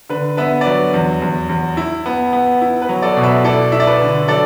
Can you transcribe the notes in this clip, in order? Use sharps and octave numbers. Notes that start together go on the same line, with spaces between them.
D3 B4
B3 B4 E5
D5
F#3 B4
E2
E2
E2
E4
B3
B3
E4
B4
F#3
A4 D5
B2
B4 E5
E4 A4 D5
E4 E5
D5
B4
D3
F#3 A4 D5